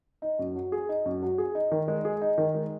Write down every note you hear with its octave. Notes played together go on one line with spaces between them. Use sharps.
D#4
F#2
F#3
G#4
D#4
F#2
F#3
G#4
D#4
D#3
G#3
G#4
D#4
D#3
G#3